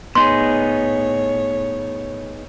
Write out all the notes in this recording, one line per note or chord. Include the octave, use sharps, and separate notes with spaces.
A2 B3 D#4 G#4 C#5 C6